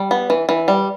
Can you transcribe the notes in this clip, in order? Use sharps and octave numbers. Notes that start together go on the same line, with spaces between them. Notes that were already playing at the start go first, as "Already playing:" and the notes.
Already playing: G3
B3
E3
E3
G3